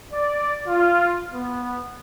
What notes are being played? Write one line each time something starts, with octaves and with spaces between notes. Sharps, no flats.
D5
F4
B3